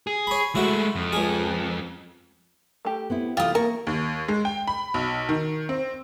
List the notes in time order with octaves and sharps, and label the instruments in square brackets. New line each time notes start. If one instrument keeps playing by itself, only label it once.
[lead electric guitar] G#4
[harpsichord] C#5 B5
[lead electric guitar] G#3 A3 [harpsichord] E4 F#4
[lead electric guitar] F2
[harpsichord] C#2 G#4
[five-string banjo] A3 G4
[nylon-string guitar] B3 C4 E4
[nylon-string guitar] C3 E3 A3 [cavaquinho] F4 D#6 [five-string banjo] G4
[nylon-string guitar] A#3 [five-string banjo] A#4 [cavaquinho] C#6
[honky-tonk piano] D#2
G#3
G5
B5
B1
D#3
C4